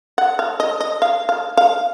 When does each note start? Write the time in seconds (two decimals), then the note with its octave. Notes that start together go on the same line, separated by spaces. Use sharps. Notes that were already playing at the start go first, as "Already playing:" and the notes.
0.18 F#5
0.39 F5
0.60 D#5
0.81 D#5
1.02 F5
1.29 F5
1.57 F5